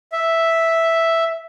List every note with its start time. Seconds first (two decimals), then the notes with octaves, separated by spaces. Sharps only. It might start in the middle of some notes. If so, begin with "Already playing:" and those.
0.12 E5